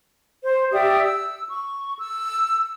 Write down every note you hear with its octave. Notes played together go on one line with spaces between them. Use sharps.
C5
G4 D5 E5 D#6
E6
C#6
E6